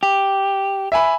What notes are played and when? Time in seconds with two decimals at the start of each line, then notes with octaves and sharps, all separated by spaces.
0.03 G4
0.92 E5 G#5 B5